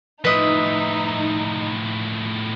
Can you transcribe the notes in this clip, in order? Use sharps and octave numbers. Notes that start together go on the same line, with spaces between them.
A2 F3 D#4 B4 D#5 E5